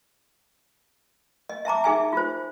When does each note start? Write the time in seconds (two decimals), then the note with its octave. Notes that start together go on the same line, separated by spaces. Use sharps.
1.49 D#5
1.65 E5 A5 A#5 D6
1.84 D#4 G#4 E5 G#5
2.13 F4 C5